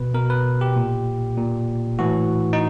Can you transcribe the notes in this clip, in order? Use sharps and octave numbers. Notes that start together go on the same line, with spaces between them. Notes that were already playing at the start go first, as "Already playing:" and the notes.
Already playing: B2 B4
B2 A#4
B4
G4
A#2
A#2
A2 E3 F#4
D#4